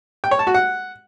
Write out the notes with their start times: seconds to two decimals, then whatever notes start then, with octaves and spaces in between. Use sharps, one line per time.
0.24 G5
0.31 C#5
0.39 A5
0.47 F#4
0.54 F#5